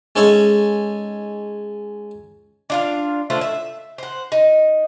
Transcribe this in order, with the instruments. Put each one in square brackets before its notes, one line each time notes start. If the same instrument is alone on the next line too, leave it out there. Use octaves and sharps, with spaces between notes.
[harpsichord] G#3 C#4 D#4 A4 C#5 E5
[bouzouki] D4 F4 F5
A3 D4 F4 C5
E5
C5 F#5
D#4